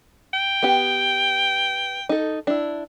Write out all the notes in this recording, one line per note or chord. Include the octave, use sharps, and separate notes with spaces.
G5
B3 G4
D#4 A4
D4 E4